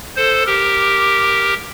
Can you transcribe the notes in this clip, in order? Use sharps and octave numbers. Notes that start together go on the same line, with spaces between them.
A4 C5
G4 A#4